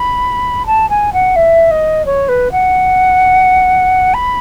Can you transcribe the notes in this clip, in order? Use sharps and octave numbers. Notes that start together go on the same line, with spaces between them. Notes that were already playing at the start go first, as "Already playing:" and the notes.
Already playing: B5
A5
G#5
F#5
E5
D#5
C#5
B4
F#5
B5